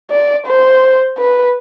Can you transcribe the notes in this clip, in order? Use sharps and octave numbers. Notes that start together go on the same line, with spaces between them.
D5
C5
B4